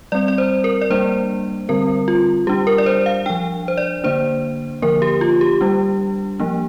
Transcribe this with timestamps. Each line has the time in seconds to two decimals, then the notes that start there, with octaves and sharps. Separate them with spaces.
0.12 G3 C4 D5
0.28 D5
0.38 C5
0.64 A#4
0.82 D5
0.90 G3 A#3 D4 C5
1.69 D3 G3 C4 A#4
2.08 F4
2.47 G3 D4 G4
2.67 A#4
2.78 D5
2.86 C5
3.06 F5
3.26 F3 D4 G5
3.68 C5
3.78 D5
4.04 D3 A#3 D4 C5
4.82 D3 F3 A#3 A#4
5.02 G4
5.21 F4
5.41 G4
5.61 G3 D4
6.40 F3 A#3 D4